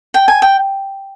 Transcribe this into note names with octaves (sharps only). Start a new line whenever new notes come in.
G5
G#5
G5